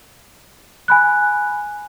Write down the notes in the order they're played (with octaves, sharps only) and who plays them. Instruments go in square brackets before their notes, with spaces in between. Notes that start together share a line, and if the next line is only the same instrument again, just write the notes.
[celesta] G#5 B5 F#6